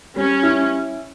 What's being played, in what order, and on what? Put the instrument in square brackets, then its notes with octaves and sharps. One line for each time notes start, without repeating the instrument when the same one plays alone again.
[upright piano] G3 [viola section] C#4
[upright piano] E4